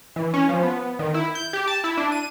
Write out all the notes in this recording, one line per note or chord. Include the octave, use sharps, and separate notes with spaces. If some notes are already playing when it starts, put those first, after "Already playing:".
E3
C#4
F3
B3
D#3
E4
G6
G4
A5
E4
D4
D#7